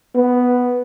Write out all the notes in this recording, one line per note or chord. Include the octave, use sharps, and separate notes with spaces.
B3